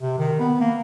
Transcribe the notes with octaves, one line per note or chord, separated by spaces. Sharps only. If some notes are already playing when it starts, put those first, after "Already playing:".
C3
D#3
B3
A#3